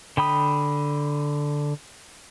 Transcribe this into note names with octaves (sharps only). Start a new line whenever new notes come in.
D3 G5 B5 D#6